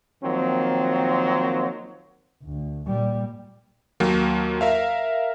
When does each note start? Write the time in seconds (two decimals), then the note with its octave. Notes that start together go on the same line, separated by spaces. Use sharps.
0.24 D#3 F3 F#3 A#3 C4
2.43 D2
2.87 A#2 G3
4.00 D#2 F#3 A#3
4.61 A#4 E5 F5